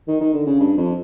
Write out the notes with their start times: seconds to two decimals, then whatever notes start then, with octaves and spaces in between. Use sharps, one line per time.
0.08 D#3
0.21 D#3
0.34 D3
0.47 C#3
0.60 G2
0.77 F2